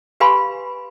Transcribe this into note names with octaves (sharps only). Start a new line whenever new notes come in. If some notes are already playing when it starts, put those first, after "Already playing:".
G4 B4 F5 G#5 B5 C6